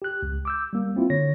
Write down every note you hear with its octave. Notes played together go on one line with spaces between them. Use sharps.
G4 F#6
C#2
D6 E6 G6
G3 A#3
A#3 C4 E4 F4
D3 C#5 A#6